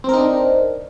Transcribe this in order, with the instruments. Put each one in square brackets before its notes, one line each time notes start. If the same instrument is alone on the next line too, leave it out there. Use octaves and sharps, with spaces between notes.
[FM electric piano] C4
A#4
D#4
D4